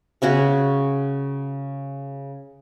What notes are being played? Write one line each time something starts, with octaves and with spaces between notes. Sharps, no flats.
C#3 C#4 F#4 G#4